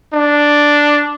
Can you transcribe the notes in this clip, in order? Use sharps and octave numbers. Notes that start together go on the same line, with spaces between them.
D4